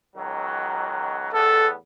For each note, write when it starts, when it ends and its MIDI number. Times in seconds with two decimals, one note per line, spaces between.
0.16 1.29 37
0.16 1.29 51
0.16 1.29 54
1.33 1.74 40
1.33 1.74 45
1.33 1.74 59
1.33 1.67 69